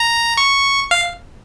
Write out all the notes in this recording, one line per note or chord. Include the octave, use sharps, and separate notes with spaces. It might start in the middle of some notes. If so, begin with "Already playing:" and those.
Already playing: A#5
C#6
F5